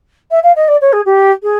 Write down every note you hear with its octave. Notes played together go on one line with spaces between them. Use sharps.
E5
F5
D#5
D5
C#5
G#4
G4
G#4